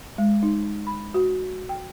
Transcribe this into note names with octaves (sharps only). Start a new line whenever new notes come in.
G#3
D#4
B5
F#4
G5